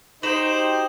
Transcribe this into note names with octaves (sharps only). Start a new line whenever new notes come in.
D#4 F#4 G4 C5 G5 E7 F#7